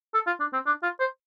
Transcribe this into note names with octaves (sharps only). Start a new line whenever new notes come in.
A4
F4
D4
C4
D4
F4
C5